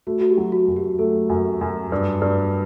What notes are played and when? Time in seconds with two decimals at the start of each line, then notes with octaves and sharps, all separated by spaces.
0.07 A3 F#4
0.20 F#4
0.30 G4
0.37 F#3
0.52 F#4
0.68 F#2
0.76 G4
0.99 A3 A4
1.29 F#2
1.61 F#2
1.92 G2
2.21 G2